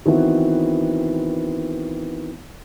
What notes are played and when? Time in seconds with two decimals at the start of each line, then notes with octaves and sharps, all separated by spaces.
0.06 D#3 E3 B3 C4 E4 F#4